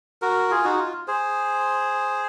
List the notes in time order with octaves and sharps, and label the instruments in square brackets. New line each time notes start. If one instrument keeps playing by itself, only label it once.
[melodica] F#4 A#4
F4 G#4
D#4 F#4
F4
G#4 C5